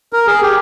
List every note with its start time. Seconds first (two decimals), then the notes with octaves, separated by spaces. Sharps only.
0.13 A#4
0.27 G#4
0.42 G4